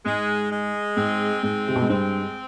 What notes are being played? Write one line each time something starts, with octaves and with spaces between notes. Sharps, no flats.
G#2 G#3
G#3
G#2 C4
G#2 G#3
C3
B2
G#2
G2 C4